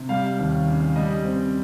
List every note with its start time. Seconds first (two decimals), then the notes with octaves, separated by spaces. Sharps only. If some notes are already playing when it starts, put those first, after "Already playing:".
Already playing: C3
0.09 G3 F5
0.39 D#2
0.67 C#3
0.96 G3 D#5
1.25 C4